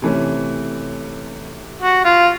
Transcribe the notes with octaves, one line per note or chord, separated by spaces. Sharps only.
C3 E3 A3 C#4
F#4
F4